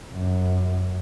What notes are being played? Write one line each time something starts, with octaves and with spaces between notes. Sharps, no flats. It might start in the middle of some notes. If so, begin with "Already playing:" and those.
F#2